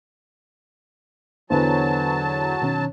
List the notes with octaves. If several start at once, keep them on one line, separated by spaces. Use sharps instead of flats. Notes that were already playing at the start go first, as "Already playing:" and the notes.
E2 D3 F#3 B4 C5 G#5 A5
B2 D#3 C#4 C#5